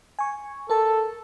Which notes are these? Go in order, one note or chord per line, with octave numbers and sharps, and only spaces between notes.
G#5 C#6
A4 A#4 A5